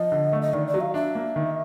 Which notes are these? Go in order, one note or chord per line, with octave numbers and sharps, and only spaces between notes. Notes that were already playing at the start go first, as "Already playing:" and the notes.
Already playing: F3 D#5
D3
A3
D#5
D#3 D5
D5
F#3
F5
D4 E5
A#3
D#3